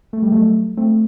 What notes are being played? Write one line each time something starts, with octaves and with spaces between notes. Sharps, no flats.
A3
G3
F#3 A3
A3 C4